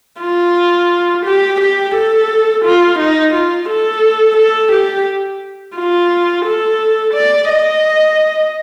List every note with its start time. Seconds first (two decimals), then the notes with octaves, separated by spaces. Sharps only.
0.21 F4
1.26 G4
1.60 G4
1.95 A4
2.65 F4
2.99 D#4
3.34 F4
3.69 A4
4.37 A4
4.72 G4
5.76 F4
6.45 A4
7.14 D5
7.49 D#5